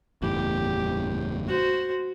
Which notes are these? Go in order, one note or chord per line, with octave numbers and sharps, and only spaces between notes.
F#1 E2 A2 G4
F#4 C5